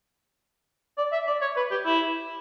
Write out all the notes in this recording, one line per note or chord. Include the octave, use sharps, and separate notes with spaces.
D5
E5
D5
C#5
B4
G4
E4